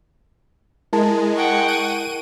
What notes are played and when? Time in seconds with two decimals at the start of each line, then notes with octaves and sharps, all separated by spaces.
0.93 G#3 E4 A#4 A5
1.36 F#5 G5 C#6
1.68 D#7